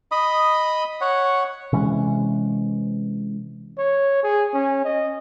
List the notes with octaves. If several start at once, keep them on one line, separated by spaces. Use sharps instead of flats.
D#5 B5 D#6
C#5 F#5
C3 E3 G#3 C#4
C#5
G#4
C#4
D#5